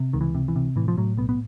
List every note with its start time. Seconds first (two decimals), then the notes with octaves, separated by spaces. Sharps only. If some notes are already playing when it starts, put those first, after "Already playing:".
Already playing: C3
0.13 C#2 D#3
0.21 E3
0.35 C3
0.48 E3
0.56 C3
0.76 A2 E3
0.88 F3
0.97 A2 F#3
1.17 B1 B3
1.29 B3